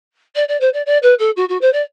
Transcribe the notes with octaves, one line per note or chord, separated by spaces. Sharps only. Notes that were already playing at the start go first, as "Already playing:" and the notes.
D5
D5
C5
D5
D5
B4
A4
F#4
F#4
C5
D5